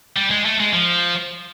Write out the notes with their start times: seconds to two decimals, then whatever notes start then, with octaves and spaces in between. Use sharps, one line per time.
0.17 G3
0.31 G#3
0.46 A3
0.60 G#3
0.74 F3